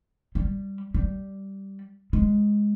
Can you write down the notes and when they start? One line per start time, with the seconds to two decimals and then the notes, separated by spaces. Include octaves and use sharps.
0.35 G3
0.94 G3
2.13 G#3